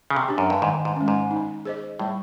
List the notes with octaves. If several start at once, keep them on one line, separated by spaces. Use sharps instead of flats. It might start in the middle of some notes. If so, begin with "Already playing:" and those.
C#3
C3
D4 G4
F#2
G2
G#2 D#3
G#2
G#3 C#4
G#2
D#4
G#4 C5 D#5
A2 G3